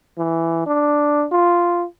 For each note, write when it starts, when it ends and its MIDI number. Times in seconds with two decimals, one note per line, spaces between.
0.18 0.65 52
0.67 1.26 62
1.32 1.85 65